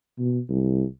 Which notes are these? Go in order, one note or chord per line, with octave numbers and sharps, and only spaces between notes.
B2
C2